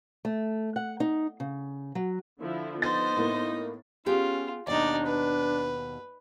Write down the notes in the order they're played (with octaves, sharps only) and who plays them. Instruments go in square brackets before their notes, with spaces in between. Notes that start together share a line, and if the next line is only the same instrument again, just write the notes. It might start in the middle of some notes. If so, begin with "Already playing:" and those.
[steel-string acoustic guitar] A3
F#5
D#4
C#3
F#3
[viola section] D3 F3 E4
[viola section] B3 [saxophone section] D#4 [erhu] C5 [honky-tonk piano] A6
[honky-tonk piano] A2 A#3
[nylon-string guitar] B3 G4 G#4 [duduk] C#4 [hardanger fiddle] F4
[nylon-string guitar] D#2 B2 [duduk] D4 [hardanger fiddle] D#4 D5
[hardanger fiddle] B4